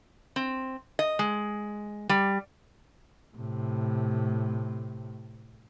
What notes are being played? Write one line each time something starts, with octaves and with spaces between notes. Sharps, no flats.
C4
D#5
G#3
G3
A2 C3